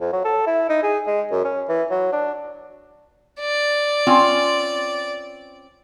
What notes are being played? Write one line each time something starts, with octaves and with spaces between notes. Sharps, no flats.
F2
F#3
A4
E4
D#4
G#4
G#3
F#2
C#4
E3
F#3
D4
D5
C4 C#4 F4